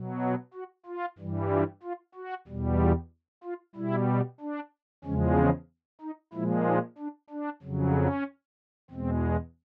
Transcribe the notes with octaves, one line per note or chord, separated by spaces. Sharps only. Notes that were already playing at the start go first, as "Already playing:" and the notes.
Already playing: B2 F#3
F#4
F#4
F4
G2 E3 G3
F4
F4
F#4
E2 B2 G3
F4
F4
B2 G3 E4
D4
E2 C#3 F3 G#3 C#4
C4
D#4
A#2 F3 G#3 E4
D#4
D4
D4
F2 C#3 F#3
C#4
E2 B2 G#3 C4